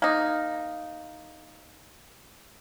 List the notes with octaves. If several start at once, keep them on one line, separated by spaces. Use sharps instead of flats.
A#3 D#4